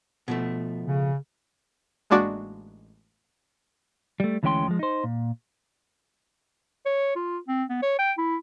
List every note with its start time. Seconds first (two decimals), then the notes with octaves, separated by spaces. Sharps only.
0.28 B2 F3 A3
0.86 C#3
2.10 A1 G#3 A#3 D4 F#4 D5
4.20 G3 A3
4.43 D2 E3 G#3 C#4 G5 C6
4.68 F3 G#3
4.79 D#4 C5
5.04 A#2
6.86 C#5
7.16 F4
7.48 C4
7.70 B3
7.82 C#5
7.99 G5
8.18 E4